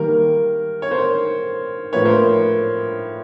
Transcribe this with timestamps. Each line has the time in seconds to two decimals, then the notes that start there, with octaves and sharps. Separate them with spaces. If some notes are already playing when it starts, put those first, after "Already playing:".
Already playing: D#3 G3 A#3 A#4
0.82 C#5
0.91 A#4 C5
1.93 A2 F3 A#3 B4 C#5
2.06 A#4 C5